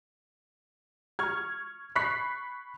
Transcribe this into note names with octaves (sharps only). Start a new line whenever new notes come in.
C#6 F6 G#6
B5 C#6 F#6 B6 C7